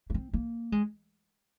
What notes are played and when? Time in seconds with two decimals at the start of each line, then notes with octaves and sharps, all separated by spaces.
0.10 A#3
0.14 C4
0.33 A#3
0.72 G#3